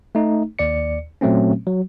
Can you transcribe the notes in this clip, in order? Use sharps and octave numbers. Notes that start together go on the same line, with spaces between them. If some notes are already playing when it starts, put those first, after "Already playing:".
A3 D#4
D#2 D5 C#7
A#2 F#3 A3 C4 C#4
F#3